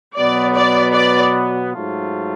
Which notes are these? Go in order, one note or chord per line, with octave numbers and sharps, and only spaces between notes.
B2 F#3 B3 D5
D5
D5
G#2 F#3 A3 F4